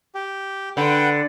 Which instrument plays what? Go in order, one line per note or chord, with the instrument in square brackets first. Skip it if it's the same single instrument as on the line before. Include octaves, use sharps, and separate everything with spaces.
[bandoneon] G4
[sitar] D3 [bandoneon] B4 F#5 G5